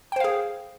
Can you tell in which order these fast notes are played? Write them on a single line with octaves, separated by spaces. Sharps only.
G5 C5 F5 G#4